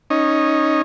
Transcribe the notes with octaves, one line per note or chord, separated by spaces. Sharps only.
C#4 D#4